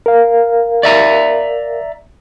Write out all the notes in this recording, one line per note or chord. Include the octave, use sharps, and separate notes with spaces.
A#4 F5
D5 E5 A#5